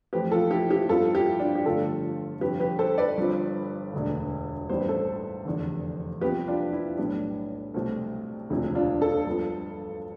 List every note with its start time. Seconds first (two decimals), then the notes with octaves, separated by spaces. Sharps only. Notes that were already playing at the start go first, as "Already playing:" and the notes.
0.13 F2 E3 A3 C4 G4 B4
0.32 F4 A4
0.51 E4 G4
0.70 E4 G4
0.89 G2 F3 B3 F4 A4
1.15 E4 G4
1.39 D4 F4
1.55 G4
1.65 G1 F2 D3 A3 C4 F4 A4
2.41 G1 F2 C3 G4 B4
2.60 G4 B4
2.79 A4 C5
2.98 B4 D5
3.18 G1 G2 F3 C4
3.93 E1 D2 D3
4.69 A1 G2 E3 G3 B3 C5
4.80 B4
4.89 A4 C5
5.45 F1 E2 D3
6.21 C2 C3 F3 B3 G4 B4
6.47 D4 F4
6.73 E4
6.97 B1 A2 G3 B3 D4
7.74 C2 B2 A3 C4
8.50 E1 D2 C3 F3
8.75 D4 F4
9.02 F4 A4
9.27 G2 F3 B3